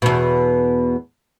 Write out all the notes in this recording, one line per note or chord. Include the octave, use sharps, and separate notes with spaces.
E2 B2